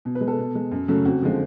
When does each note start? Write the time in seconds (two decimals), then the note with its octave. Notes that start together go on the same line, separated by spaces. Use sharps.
0.05 B2
0.15 B4
0.21 G#3
0.28 A4
0.38 B2
0.55 G#3
0.71 F#2
0.88 C#3 F#3 A3
1.05 F2 F#4
1.22 D3 F3 G#3